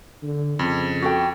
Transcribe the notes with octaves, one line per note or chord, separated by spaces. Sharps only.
D3
F2 C#3
F#4 A4 G5